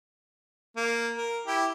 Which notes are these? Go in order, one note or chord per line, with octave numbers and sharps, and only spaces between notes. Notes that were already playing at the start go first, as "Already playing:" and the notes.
A#3
A#4
E4 G4